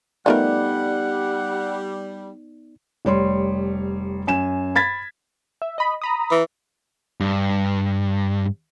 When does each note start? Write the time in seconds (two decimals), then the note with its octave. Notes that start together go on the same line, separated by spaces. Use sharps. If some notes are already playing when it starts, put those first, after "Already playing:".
0.26 F3 G3 A3 B3 D#4 A#4 D5 F#5
3.05 F1 G3 C#5 C6
4.27 F#2 G#5 E7
4.75 B5 G#6 A6 B6
5.62 E5
5.78 D#5 B5
6.02 A#5 B5 D#6
6.31 E3
7.20 G2